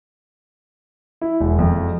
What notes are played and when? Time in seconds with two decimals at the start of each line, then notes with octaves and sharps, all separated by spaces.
1.21 E4
1.40 E1
1.59 F2